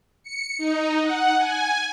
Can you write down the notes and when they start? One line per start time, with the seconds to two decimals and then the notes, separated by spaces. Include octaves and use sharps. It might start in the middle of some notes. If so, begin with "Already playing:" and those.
0.23 C#7
0.58 D#4
1.01 F#5
1.38 G#5